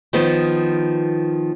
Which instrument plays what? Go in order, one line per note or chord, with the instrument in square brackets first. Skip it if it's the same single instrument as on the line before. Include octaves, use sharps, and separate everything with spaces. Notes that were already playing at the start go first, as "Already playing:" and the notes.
[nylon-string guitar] D#3 F3 B3